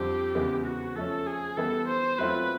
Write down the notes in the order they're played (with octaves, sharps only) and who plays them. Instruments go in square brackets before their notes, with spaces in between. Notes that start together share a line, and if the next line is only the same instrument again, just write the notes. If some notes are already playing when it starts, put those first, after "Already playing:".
Already playing: [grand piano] F2 D3 G3 C4 [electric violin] G4
[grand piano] E2 C#3 E3 G#3 B3
[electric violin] F#4
[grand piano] F3 A3 C#4 [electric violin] A4
[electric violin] G#4
[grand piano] E3 G3 B3 [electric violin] A4
[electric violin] C5
[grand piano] F#3 A3 C4 F4 [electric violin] B4